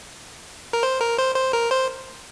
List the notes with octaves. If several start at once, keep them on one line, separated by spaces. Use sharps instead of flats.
A#4
C5
A#4
C5
C5
A#4
C5